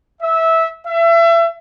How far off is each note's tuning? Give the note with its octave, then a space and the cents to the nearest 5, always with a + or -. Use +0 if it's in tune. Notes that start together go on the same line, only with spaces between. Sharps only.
E5 -15
E5 +30